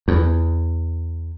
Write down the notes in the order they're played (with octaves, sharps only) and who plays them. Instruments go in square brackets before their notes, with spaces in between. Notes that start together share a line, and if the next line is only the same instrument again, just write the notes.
[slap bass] E2